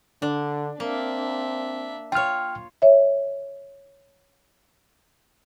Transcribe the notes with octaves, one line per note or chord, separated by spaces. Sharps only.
D3 D4
A#3 C4 D4 E5
F4 C#5 G5 F6
C#5 E5